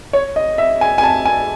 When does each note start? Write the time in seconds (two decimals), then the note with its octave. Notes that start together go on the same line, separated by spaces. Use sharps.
0.13 C#5
0.36 D#5
0.58 E5
0.81 G#5
0.98 G#5
1.04 A5
1.25 G#5